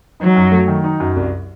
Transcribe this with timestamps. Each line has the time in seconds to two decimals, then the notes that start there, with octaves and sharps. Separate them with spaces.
0.20 F#3 D#4
0.36 F#2
0.52 A3
0.68 D#3
0.84 D#4
1.00 F#2
1.16 C2